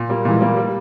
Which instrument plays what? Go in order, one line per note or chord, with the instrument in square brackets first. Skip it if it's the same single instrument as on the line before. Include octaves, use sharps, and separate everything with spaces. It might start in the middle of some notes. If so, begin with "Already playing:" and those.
Already playing: [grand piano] A#2
G3 A#3
[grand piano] A#2 [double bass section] E3 G#3
[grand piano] G3 A#3
G3